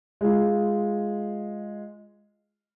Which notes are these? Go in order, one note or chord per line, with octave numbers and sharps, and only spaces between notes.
G#3 F4